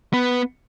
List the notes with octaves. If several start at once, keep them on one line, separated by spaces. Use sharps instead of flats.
B3